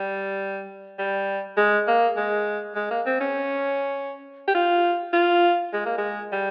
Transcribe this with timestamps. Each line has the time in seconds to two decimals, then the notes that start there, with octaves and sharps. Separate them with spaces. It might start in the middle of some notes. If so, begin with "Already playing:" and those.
Already playing: G3
0.98 G3
1.57 G#3
1.88 A#3
2.17 G#3
2.75 G#3
2.91 A#3
3.06 C4
3.20 C#4
4.48 G4
4.55 F4
5.13 F4
5.73 G#3
5.86 A#3
5.98 G#3
6.32 G3